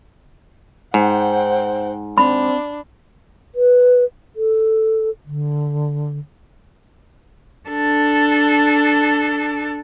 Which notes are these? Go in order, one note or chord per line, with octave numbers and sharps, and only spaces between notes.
G#2 C5 F#5 G5
C4 D4 B5
B4
A4
D3
D4 A4